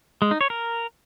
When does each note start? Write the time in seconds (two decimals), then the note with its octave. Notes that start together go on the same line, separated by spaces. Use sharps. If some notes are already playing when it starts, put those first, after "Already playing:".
0.22 G#3
0.31 D#4
0.41 C#5
0.50 A#4